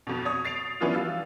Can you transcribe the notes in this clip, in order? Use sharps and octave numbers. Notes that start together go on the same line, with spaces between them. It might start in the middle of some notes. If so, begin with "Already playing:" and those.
F2 B2
C#5 C#6 D#6
A6 C7 D7 F7
E3 F3 B3 C#4 D4 F4
G3 F5 E6 A6